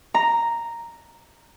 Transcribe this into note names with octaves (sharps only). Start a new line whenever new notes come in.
A#5